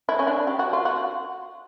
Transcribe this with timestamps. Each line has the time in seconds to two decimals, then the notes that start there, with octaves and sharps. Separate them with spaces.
0.09 E4
0.19 C#4
0.27 D4
0.47 G4
0.59 F#4
0.73 F4
0.85 F#4